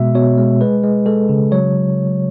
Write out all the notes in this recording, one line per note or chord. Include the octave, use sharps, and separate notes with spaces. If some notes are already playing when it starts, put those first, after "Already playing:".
Already playing: B2 G#3 E5
B2 C#5
G#3
G#3 B4
G#3
G#3 A4
C#3
F#3 C#5